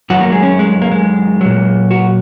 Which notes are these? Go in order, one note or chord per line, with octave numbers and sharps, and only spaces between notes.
F#2 D#3 F#3 F#4
A#3
G#3
C#4
G#3
A#3
G#3
A#2 F#3
F#4